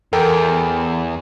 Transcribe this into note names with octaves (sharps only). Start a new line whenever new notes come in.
E2 A4 A#4 G5